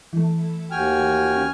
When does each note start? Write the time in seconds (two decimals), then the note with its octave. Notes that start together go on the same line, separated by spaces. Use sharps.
0.13 E3 A3
0.71 D#2 F#4 G5 G#5 F6
1.18 F4
1.36 C#4